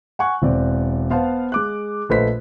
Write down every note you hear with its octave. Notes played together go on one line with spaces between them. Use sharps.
F#5 G#5 C#6 F#6
E1 C4 D5
B3 C5 F5 A5
G#3 D6 F#6
A#1 A3 B4 C5 D#5 B6